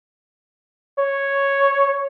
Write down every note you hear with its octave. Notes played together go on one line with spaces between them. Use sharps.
C#5